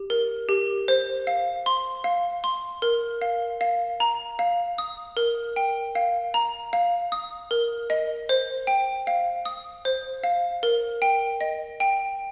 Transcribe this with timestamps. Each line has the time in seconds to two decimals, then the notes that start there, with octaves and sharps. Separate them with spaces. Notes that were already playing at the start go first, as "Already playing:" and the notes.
Already playing: G4
0.10 A#4
0.49 G4
0.88 C5
1.27 F5
1.66 C6
2.04 F5
2.44 C6
2.82 A#4
3.22 F5
3.61 F5
4.00 A#5
4.39 F5
4.78 D#6
5.17 A#4
5.56 G5
5.95 F5
6.34 A#5
6.73 F5
7.12 D#6
7.51 A#4
7.90 D#5
8.29 C5
8.67 G5
9.07 F5
9.45 D#6
9.85 C5
10.24 F5
10.63 A#4
11.02 G5
11.41 D#5
11.80 G5